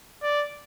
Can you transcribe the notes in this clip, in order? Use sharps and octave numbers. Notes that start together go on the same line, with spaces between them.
D5